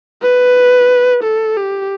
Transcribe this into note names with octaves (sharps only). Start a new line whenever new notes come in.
B4
A4
G4